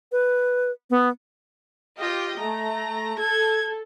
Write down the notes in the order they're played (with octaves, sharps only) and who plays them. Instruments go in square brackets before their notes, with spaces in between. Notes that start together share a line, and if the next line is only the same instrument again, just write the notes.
[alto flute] B4
B3
[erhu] F4 [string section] G4 D#5 G5
[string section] A3 [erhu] A#5
[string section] A4 [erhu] G#6